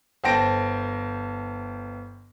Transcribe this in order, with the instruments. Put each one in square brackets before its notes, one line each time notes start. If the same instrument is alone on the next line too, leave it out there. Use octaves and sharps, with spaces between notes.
[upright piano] G1 C5 G5 A5 A#6 D7